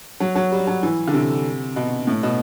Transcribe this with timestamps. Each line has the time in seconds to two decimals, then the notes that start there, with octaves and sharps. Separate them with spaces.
0.20 F#3
0.35 F#3
0.52 G3
0.67 F#3
0.83 E3
1.07 D3
1.13 C3
1.76 B2
2.07 A2
2.23 B2